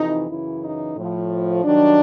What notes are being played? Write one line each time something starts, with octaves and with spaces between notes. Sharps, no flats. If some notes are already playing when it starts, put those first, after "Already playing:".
Already playing: F2 C3 E3 D#4
F#2 C#3 E3 E4
D#4
A2 F3
G2 D#3 F#3 D4